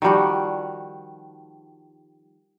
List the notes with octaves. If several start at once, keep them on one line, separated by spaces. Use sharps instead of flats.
D#3 F3 G3 F#4